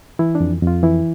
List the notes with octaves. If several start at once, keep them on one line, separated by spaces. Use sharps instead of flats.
E3 E4
D4
F2
F2
F4
E3 E4